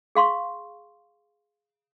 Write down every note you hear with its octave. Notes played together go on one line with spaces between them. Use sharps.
G#4 F5 C6 C#6